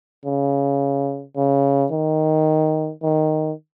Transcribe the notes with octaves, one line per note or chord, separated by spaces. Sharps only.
C#3
C#3
D#3
D#3